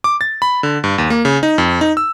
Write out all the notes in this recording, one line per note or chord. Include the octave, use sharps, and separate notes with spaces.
D6
A6
B5
D3
G2
D#2
A#3
C#3
D#4
F2
D#4
E6